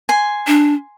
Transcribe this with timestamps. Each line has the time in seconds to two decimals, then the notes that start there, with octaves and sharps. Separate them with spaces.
0.09 G#5 C6
0.47 D4